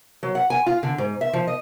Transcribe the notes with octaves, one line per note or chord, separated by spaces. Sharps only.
F#3
F#5
G#5
F4
D3
G#2
E5
F3
D#5